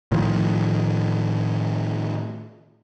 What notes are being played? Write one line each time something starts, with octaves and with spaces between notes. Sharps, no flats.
A2 D#3 F3